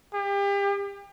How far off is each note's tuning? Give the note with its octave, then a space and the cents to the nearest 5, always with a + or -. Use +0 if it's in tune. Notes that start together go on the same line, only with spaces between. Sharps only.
G4 +35